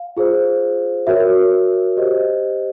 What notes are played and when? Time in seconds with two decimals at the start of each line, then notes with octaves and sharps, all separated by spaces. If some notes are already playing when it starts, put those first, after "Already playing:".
Already playing: F5
0.17 F4 G#4 C5
1.07 F#4 A#4 C#5 E5
1.97 G4 C5 D#5